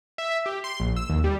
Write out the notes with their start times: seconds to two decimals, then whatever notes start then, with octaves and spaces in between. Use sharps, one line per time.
0.18 E5
0.46 G4
0.64 C6
0.80 A#1
0.96 E6
1.10 D#2
1.24 G3